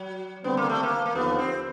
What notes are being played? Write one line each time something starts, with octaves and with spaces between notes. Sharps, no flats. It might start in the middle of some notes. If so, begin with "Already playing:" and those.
Already playing: F#3
D3 G3 B3 C4
A#3
A3
A#3
A#3
D#2 D3 F3 B3
C4